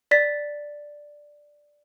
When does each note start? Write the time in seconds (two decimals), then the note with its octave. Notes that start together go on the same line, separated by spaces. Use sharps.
0.11 D5 A6 B6